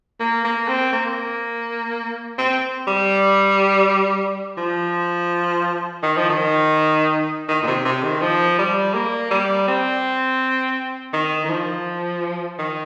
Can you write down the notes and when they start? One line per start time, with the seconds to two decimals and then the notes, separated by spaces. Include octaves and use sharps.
0.20 A#3
0.45 A#3
0.68 C4
0.93 A#3
2.38 C4
2.87 G3
4.57 F3
6.03 D#3
6.17 F3
6.30 D#3
7.49 D#3
7.63 A#2
7.67 C3
7.85 C3
8.03 D#3
8.22 F3
8.59 G3
8.94 A#3
9.31 G3
9.68 C4
11.13 D#3
11.45 D#3
11.50 F3
12.59 D#3